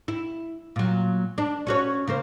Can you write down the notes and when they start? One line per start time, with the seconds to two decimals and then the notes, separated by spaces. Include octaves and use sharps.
0.08 E4
0.76 A#2 F#3
1.38 D4
1.67 C#4 F#4 C#5
2.07 C#3 A#3 C5